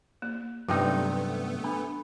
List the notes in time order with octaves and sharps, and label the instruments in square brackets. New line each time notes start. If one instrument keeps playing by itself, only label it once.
[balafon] A#3
[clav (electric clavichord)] G2 C3 D#4 [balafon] F#3 [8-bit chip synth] A3 B3 [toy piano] F4 G5
[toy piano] G4
D4 A4 B5